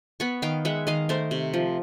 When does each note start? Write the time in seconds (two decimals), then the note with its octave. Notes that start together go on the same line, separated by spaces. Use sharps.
0.20 B3 B5 C#6
0.42 D#3 F5 G5
0.65 G#3 E5 F#5
0.87 D#3 D#5 F5
1.09 A3 A#4 C5
1.31 C3
1.54 F3